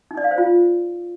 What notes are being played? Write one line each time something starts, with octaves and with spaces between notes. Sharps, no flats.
D#4
D5
F5
C5
F4